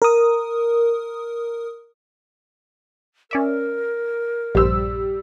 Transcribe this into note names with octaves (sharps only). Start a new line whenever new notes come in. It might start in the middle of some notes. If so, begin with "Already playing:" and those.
A#4 D#6
C#4 A#4 D5 E5
A#1 G2 G3 C5 E6